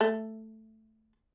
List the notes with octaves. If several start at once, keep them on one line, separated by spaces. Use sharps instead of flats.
A3